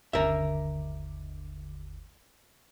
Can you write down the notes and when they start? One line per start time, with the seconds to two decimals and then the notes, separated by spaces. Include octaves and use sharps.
0.13 G1 D#2 D3 A#4 E5